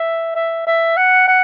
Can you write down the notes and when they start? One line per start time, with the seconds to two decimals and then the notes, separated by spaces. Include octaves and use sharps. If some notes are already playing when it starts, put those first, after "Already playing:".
Already playing: E5
0.35 E5
0.67 E5
0.97 F#5
1.28 F#5